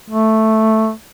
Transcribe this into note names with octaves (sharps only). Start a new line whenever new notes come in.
A3